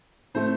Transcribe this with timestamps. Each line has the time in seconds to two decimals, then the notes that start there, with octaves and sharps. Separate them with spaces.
0.34 A2 A3 C4 C5